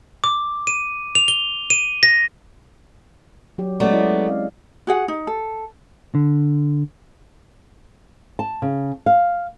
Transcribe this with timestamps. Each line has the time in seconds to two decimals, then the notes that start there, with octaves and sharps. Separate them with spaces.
0.24 D6
0.67 D#7
1.15 F7
1.28 G7
1.70 D#7
2.03 A#6
3.58 F#3 G4
3.80 F#3 G#3 A3 B3 C#4 D5
3.93 E4 D5 D#5
4.27 C4 F5
4.87 F#4 G#4 F#5
5.08 D#4
5.27 A4
6.15 D3
8.39 A5
8.62 C#3
9.06 F5